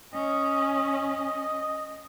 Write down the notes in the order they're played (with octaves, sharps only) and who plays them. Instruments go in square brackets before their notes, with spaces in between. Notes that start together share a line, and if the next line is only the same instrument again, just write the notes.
[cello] C#4 [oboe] D#5